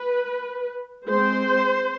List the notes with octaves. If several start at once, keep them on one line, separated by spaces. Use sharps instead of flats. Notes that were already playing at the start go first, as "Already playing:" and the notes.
Already playing: B4
G#3 C4 C5